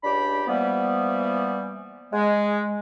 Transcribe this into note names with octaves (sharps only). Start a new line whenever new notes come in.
C#2 D4 G4 D5 B5
E3 F3 G3 A#3 B3
G#3